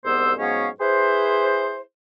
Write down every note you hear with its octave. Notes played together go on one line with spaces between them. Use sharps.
C2 G#2 B3 C5 E6
G#2 F#3 B3 C#4 C#5 F5
E4 G#4 B4 C5